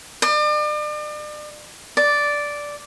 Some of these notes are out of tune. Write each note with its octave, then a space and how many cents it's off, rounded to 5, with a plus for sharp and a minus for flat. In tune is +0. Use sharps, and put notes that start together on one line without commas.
D5 +40
D5 -5